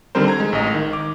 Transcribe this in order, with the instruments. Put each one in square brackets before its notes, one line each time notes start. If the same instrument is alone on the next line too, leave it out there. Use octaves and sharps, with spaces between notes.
[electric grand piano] D3 D#3 G3 C4 A#4 C5
A#5 G#6
G#3
A1 D#5
D#3
D6